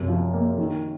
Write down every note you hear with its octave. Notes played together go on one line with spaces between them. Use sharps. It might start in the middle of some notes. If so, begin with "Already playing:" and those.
Already playing: F#2 C3
F3
A#3
D#3